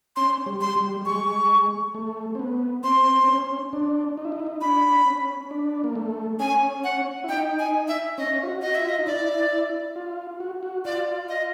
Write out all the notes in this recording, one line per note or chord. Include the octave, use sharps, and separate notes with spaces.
C#4 C6
G3
C6
G3
G3
G#3 C#6
A3
C4
B3
C4 C6
C4
C#4
D4
D#4
E4
D#4
E4
D#4
D4 B5
C#4
D4
A#3
A3
C#4 G#5
F#5
E4
D#4 G5
G#5
E5
C#4 D#5
F4
F#4
D#5
F4 E5
D#5
D#4
E4 D5
F4
F#4
F#4
F4 D5
D#5